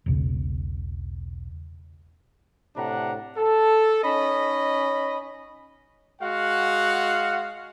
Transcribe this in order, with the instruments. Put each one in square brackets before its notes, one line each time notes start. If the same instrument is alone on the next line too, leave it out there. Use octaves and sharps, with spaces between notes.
[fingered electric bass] E1 B1 C#3
[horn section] A2 C3 D4 F#5 A#5
A4
C#4 D#4 D#5 B5
[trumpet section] G#3 F#4 F5 F#5